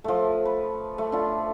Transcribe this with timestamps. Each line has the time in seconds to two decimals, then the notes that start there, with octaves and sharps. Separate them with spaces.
0.04 F3 A3
0.45 B4
0.98 A3
1.12 D4 F4